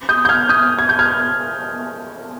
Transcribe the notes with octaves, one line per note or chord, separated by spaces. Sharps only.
D#6 G6
G6
F6 G#6
D#6 G6
G#6
G6
F6 G#6